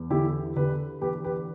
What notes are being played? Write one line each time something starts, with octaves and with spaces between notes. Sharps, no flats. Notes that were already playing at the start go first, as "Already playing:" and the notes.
Already playing: E2
D3 E4 G4
D3 G4 B4
E3 G4 B4
G4 B4